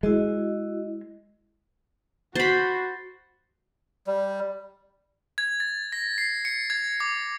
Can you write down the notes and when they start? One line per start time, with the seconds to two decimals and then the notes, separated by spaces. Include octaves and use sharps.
0.03 G#3 E4 F#4 D#5
2.35 F#4 C5 B5 A6 C7
4.07 G3
5.38 G#6
5.60 A6
5.92 A#6
6.18 C7
6.45 C#7
6.70 G#6
7.00 D6